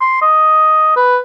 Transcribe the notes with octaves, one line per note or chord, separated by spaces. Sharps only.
C6
D#5
B4